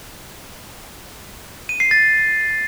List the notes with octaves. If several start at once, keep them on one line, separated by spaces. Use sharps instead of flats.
D#7
C7
A6